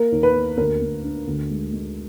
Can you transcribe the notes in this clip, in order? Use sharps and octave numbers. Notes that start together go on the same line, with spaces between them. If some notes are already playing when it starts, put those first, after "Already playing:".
Already playing: A#3 A#4
D#2
B4
A#3
D2 A#4
D2
D4
D2
G#3
G#3